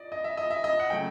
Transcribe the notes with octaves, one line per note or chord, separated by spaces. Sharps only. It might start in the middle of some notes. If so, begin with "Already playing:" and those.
Already playing: D5 D#5
D#5
E5
D#5
E5
D#5
F#5
C#3 F#3 A3 G5